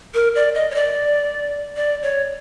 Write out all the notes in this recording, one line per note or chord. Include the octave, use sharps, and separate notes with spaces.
A#4
D5
D#5
C#5
D5
D5
C#5